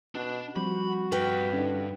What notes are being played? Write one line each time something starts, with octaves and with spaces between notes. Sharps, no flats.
B2 D4
F3 G3 C4 F#4 B5
G2 B4 G5
D3 C#4 D#4